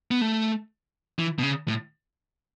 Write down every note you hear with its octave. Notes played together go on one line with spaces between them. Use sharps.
B3
A3
E3
B2
C#3
A2